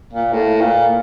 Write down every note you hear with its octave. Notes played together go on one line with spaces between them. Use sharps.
A#2
A2
A#2